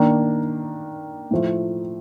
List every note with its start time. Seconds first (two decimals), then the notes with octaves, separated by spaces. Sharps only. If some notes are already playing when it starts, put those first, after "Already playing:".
Already playing: D#3 A#3 D4
1.31 A2 F3 A3